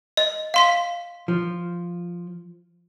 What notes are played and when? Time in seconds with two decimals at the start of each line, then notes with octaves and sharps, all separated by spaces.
0.17 D#5
0.54 F5 C6 B6
1.28 F3